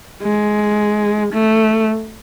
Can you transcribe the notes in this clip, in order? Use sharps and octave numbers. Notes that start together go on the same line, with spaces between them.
G#3
A3